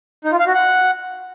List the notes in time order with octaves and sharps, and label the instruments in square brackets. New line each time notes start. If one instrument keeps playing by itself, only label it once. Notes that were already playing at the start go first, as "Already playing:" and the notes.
[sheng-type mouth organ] D#4
F4
F5
F#4
F#5